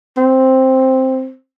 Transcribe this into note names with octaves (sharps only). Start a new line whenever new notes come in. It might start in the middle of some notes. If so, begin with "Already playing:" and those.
C4